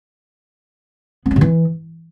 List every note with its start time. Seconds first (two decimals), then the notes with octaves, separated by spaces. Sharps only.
1.26 B3
1.31 C4
1.36 C3
1.41 E3